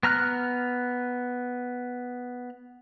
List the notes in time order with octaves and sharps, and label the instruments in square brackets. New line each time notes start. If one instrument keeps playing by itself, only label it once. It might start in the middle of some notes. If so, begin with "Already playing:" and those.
[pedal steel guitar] B3 A#5 F6 F#6